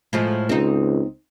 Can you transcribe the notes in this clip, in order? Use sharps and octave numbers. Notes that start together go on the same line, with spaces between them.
A2 F3 G#3
C#2 C4 D#4